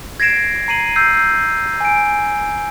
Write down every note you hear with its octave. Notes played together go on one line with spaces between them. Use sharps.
G#6 A#6 C7 D7 E7
A#5 C7 D#7 F#7
E6 G6 C7
G#5 D7